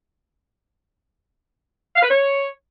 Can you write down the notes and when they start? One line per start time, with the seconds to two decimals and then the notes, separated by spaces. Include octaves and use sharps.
1.96 F5
2.03 B4
2.09 C#5